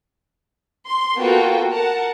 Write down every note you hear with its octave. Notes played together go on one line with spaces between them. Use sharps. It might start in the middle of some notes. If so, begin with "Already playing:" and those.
C6
A#3 B3 F4 F#4 A4 G5
A#4 F#5 A5